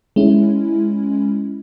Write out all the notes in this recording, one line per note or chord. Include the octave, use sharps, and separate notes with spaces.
G#3 C#4 E4